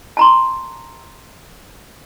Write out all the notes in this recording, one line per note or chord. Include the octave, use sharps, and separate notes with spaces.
A5 A#5 C6